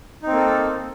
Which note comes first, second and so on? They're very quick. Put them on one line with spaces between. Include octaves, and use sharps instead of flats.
D#4 C4 A#3 A4